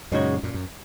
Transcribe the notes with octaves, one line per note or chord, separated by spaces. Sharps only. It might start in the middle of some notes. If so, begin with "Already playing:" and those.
F#2 A#2 C#3 G#3 D#4 F#4 C#5
F#2 A#2
F#2